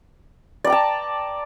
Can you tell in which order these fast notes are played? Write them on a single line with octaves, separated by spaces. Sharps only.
D5 A#5 G5 A5